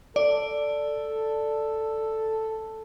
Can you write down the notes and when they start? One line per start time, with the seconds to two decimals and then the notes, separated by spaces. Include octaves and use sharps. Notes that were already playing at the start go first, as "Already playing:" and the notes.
0.16 A4 D5